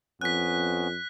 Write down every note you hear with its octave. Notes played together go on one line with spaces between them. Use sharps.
F2 B3 C#4 F#6 B6